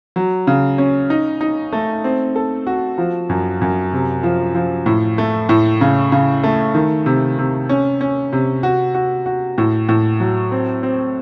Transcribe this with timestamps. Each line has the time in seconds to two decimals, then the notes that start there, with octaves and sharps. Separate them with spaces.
0.16 F#3
0.47 C#3
0.78 C#4
1.10 D#4
1.41 D#4
1.72 A3
2.04 C4
2.36 A4
2.67 F#4
2.98 F3
3.29 F#2
3.61 F#2
3.93 C3
4.23 F3
4.55 F3
4.86 A2
5.18 A3
5.49 A2
5.81 C#3
6.12 C#3
6.43 A3
6.75 D#3
7.06 C3
7.39 C3
7.69 C#4
8.01 C#4
8.33 C3
8.63 F#4
8.95 F#4
9.26 F#4
9.58 A2
9.89 A2
10.20 F#3
10.51 C4
10.83 C4